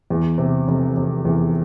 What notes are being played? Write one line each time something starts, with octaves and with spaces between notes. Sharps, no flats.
E2
C3
F1
F1
E2